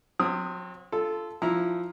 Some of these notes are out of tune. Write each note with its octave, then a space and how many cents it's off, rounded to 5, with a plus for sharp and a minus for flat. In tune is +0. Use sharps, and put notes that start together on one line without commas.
F#3 -40 C4 +0 D#6 +0
F4 -15 A4 -5
F3 +5 E4 +0 A#5 +0